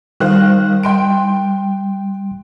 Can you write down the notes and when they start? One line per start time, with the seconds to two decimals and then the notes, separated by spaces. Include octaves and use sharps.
0.20 D#3 G3 C5 F5 F#6
0.83 G5 C6 D7